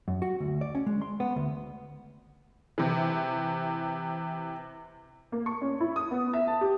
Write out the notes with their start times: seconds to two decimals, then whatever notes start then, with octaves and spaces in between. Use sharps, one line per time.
0.08 F#2
0.22 F#4
0.40 D2
0.61 D5
0.75 C#4
0.86 G#3
1.01 C6
1.20 B3
1.36 D2
2.78 C3 E3
5.32 A#3
5.46 C#6
5.62 C#4
5.80 E4
5.96 D#6
6.11 B3
6.33 E5
6.47 A5
6.61 G4